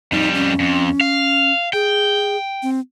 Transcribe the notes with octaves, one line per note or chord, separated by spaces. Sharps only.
F2 G3 D#4
C#4
F2
F5
G#4 G5
C4